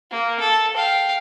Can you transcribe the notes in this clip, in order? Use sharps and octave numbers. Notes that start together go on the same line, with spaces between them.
A#3
A4
F5 G5